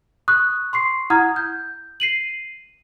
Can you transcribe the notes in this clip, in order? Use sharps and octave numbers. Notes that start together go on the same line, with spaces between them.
C#6 D#6 F#6
C6 C#6 C7
E4 F#5 A#5 D#6 F6 G#6
G6
C7 D#7 F#7